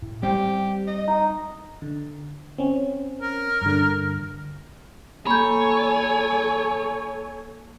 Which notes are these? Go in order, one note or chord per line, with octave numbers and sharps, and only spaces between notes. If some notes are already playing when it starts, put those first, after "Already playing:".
A2
G3 C4 G4
D#5
D#4
D3
C4 C#4
A#4
G2 D3
A#3 A4 C#5 G#5 B5 G6